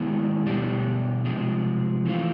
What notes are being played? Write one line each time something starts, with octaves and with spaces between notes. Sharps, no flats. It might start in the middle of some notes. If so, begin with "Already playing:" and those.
Already playing: D#3 G#3 B3 E4 G#4
B2 G3 B3 D4 G4
C3 F3 G#3
E3 A3 C4 F4